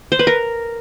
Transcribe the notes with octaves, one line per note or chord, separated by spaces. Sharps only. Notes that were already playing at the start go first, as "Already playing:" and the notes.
C5
B4
A#4